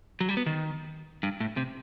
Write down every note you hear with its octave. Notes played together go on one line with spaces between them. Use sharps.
F#3
G3
B3
D#3
G2
A2
C3